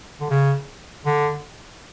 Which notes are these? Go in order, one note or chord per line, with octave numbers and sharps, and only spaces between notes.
D3
C#3
D3